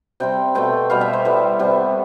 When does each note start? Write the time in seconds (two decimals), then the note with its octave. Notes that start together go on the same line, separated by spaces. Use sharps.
0.20 C3 G3 C4 G5
0.55 B2 A3 C4 G5
0.90 B2 G3 B3 F5
1.01 E5
1.13 C5
1.25 A2 G3 B3
1.59 C3 G3 B3